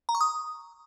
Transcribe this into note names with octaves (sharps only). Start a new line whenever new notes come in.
A#5
C#6
D#6